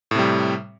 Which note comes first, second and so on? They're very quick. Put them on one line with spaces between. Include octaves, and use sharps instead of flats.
A2 C3 G3